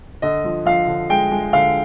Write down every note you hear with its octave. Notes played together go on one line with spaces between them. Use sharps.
D3 D#5
F3
F3 F5
D3
G#3 G5
G#3
D3 F5